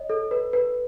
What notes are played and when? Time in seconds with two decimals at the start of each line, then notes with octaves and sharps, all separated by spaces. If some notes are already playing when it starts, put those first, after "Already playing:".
Already playing: C#5 D#5
0.10 A4
0.31 B4
0.53 B4